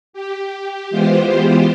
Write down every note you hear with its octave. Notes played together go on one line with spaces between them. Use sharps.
G4
E3 G#3 B3 F4 G4 C5